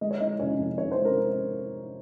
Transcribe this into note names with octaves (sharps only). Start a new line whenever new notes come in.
G#3 D#5
C#5
G#3 D#4 D#5
F1 C#4 C#5
F2
F1 C#5
C5
G#3
A#4